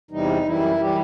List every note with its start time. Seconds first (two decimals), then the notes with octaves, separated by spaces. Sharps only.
0.11 E2 C3 E3 G3 D#4
0.45 F#2 E3 G3 E4
0.79 E3 G3 G4